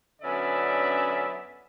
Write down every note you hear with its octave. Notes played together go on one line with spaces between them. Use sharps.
F#2 D3 B3 C#4 D5 E5